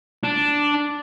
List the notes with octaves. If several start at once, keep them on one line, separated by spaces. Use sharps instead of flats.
D4